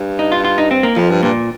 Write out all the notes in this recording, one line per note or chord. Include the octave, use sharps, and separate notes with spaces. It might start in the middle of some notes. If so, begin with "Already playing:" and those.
Already playing: G2
D#4
F4
F4
D#4
C4
A#3
F2 F3
G2
G2 A#2